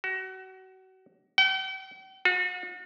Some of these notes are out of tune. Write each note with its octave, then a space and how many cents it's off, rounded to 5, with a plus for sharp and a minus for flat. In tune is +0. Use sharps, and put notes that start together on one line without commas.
F#4 +30
G5 -45
F#4 -40